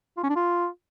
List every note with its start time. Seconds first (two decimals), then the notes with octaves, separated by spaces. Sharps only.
0.17 F4
0.23 C#4
0.29 D4
0.36 F4